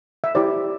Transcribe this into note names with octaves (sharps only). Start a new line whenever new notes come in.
E5
E4 G4 C5 D5